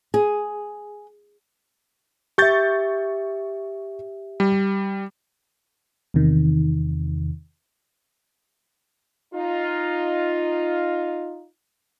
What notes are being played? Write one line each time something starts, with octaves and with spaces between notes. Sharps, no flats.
G#4
G4 E5 C#6 G6 A6
G3
E2 C3 D#3
D#4 F4